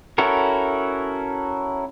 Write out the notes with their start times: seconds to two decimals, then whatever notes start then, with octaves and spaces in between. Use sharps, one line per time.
0.18 C#4 E4 F#4 A4 A#4